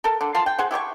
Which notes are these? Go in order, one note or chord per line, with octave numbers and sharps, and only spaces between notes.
A4 A#4
D3
F4 A5 C6
G5
G#4 C5 F#5
E4 G4 G#5 C#6